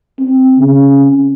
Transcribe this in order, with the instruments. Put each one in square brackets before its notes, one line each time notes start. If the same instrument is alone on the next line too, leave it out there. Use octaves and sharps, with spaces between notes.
[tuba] C4
C#3